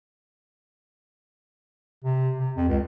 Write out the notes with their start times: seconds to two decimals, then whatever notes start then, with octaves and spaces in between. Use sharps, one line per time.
2.04 C3
2.39 C3
2.56 F2
2.69 C#2